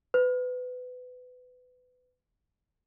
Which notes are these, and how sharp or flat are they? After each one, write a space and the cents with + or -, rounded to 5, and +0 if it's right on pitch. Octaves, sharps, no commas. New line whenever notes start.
B4 +25